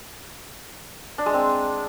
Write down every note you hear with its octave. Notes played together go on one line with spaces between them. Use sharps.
D4
G#3
C4